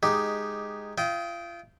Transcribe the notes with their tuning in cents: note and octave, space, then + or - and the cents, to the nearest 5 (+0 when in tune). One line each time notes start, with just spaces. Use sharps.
G#3 +0 D#4 -5 G4 +0
F4 -30 D#5 +25 G5 -15